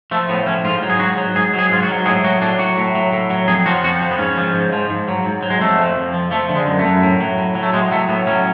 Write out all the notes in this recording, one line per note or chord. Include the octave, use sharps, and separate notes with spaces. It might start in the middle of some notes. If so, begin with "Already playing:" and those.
F3 A3
A2 B3
F3 C#4
G#2 F4
F#3
G#4
G#2 F#4
F#3
G#2 G#4
F#3 G#4
G#2 F4
F#4
F#3
A2 G#4
F#3 F#4
A2 D4
F#3 F#4
A2
F#3
A2
F#3
F2 G#4
F3 F#4
F2 F#4
F3
B3
G#2 C#4
F3
G#2
F3
G#2
F#3
G#2
F#3
G#3
F2 A3
F3
F2
F3
F3 A3
D3
G#3
F#2
A3
F#2
A2
F#3
A2
F#3
A3
A2 G#3
F#3 A3
A2 B3
F#3 C#4